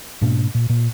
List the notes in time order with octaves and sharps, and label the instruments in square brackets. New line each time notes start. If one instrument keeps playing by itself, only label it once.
[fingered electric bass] G#2 B2 A#3 D4
A#2
A#2